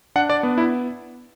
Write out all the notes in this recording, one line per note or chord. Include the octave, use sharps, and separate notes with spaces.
D4 F#5
D5
B3
E4